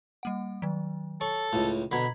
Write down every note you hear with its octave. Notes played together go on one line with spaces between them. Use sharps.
G3 A#3 F#5
D#3 F#3
A4 C#5 C#6
C#2 A2
B2 D3 A#5 B5 G#6 B6